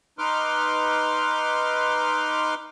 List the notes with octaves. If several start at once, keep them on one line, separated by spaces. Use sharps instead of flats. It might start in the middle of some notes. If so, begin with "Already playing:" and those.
D#4 B4 C6 D6 F6